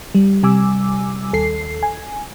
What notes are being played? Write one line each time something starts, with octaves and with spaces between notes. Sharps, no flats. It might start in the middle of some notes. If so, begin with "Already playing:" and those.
G3
C3 G3 G#5 D6 E6
D#2 A4 C7
G#5